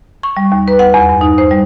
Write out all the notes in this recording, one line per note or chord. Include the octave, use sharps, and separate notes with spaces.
C#6
G3
D#2
B4
F#5
E2
G2
D#4
C5
G3